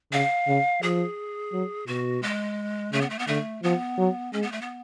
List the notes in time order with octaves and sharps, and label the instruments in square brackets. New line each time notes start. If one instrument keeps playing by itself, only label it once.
[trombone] C#3 [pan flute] F5
[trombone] C#3
[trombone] F3 [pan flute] G#4
[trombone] F#3
[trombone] B2 [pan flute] F#4
[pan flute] G#3
[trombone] C#3 [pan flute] A3
[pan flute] B3
A3
B3
[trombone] D3 [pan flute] A3
[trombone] F3 [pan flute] B3
[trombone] F#3
[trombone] G#3 [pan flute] C#4
[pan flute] B3
A3
B3